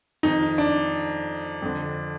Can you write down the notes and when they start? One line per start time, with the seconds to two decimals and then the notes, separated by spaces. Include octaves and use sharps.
0.23 F2 D#3 D#4
0.58 D4
1.62 F2 D3